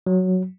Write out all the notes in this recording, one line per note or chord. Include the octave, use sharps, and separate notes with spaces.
F#3